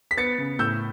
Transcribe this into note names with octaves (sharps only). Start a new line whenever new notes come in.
B6
B3 A6 C#7
C#3
A2 E6 G6